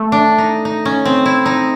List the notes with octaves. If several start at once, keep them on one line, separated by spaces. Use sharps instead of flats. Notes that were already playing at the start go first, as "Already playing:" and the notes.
Already playing: A3
D4
D#4
D#4
C#4
C4
E4
D#4